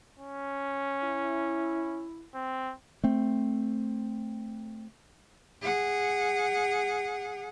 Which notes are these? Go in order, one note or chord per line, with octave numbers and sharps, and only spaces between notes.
C#4
E4
C4
A3 C4
G#4 F#5